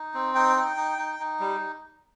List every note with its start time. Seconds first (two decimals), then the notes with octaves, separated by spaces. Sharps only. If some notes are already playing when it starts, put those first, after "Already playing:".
Already playing: D#4
0.14 C4
0.35 D#4 G5
0.56 D#4
0.77 D#4
0.98 D#4
1.20 D#4
1.40 G3